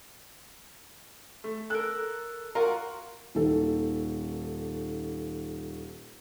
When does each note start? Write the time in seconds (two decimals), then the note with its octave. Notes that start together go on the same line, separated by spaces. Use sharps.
1.44 A3
1.70 A4 A#4 F#6
2.55 F4 F#4 A#4
3.35 D#1 D#3 A4